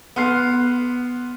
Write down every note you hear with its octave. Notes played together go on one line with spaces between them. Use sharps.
B3 C6 F6 C7